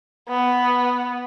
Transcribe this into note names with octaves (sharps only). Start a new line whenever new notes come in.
B3